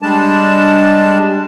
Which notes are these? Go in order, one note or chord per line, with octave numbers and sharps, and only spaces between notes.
G3 G#3 D4 A5